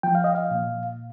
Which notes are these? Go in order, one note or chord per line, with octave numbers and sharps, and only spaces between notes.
F3 G5
F5
D#5
F5
A#2